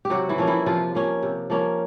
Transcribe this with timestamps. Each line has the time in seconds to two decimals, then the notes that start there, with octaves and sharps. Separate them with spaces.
0.05 G4
0.10 C3 F#3 F#4
0.29 E3 E4
0.38 F3 A#3 C#4
0.47 E3 E4
0.66 C3 F3 F4
0.95 F3 A#3 C#4
1.23 C3
1.50 F3 A#3 C#4